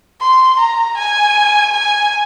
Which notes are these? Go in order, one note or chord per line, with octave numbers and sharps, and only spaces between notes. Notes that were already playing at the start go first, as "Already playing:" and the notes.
C6
A#5
G#5
G#5